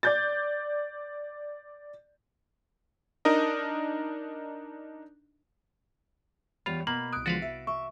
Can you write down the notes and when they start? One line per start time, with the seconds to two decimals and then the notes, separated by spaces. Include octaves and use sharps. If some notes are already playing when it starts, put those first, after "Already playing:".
0.03 D5 G6 A6
3.25 D4 D#4 A#4 D#5
6.66 E2 G3 F4 C#5 B5 F7
6.87 B2 A#3 A#5 B5 F#7
7.12 C2 D#6 F#6 D7
7.26 D3 F3 G#3 F#4 B4 F5 A6
7.42 E5
7.67 E5 C#6